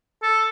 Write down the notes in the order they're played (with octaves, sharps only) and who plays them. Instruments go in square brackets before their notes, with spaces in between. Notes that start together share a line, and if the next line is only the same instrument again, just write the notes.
[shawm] A4